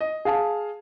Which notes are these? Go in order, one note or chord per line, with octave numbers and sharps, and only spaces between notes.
D#5
G#4 F5 A5